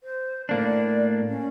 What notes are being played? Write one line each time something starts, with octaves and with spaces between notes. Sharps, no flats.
C5
A2 A#3 D4 D5
C#4